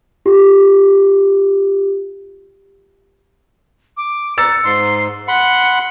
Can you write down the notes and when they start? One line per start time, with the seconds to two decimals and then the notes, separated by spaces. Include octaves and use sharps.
0.26 F4 G4
3.97 D6
4.38 A#5 E6 A6 C#7
4.64 G#2 C6
5.28 F#5 B5 C6 C#7